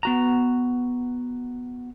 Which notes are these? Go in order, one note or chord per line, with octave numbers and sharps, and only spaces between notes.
B3 F#4 A#5